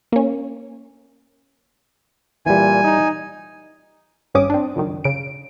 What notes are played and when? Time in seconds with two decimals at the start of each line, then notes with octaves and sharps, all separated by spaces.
0.12 A#3 C#4
2.46 A#2 E3 G3 G#5
2.84 D#4
4.34 G#1 G2 C#4 D6 D#6
4.50 C4 D4
4.76 C#2 F#2 D#3
5.04 C#3 D7